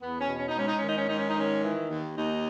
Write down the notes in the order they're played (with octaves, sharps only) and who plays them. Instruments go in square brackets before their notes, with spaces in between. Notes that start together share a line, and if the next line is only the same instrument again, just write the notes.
[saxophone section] E2 B3
C#4
B2
C#4
D#4
G#2 C#4
D#4
D#3 C#4
D#4
C#4
G#2 D#4
C#4
D#4
D#3 C#4
E3
D#2
D#2 D#4